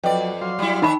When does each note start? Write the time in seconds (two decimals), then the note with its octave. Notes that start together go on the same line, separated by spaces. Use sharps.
0.04 F2 F#3 B4 D5 D#5 G5
0.41 F#3 F5 C6
0.59 G3 E4
0.82 D#3 D#4 D#5 E5 B5